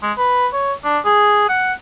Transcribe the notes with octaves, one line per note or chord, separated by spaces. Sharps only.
G#3
B4
C#5
D4
G#4
F#5